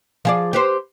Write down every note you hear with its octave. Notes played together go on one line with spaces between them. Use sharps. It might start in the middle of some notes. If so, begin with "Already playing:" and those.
F3 G#4 D5
G4 B4 C5